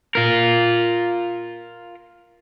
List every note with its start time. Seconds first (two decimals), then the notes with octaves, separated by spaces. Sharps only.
0.15 F4 A#4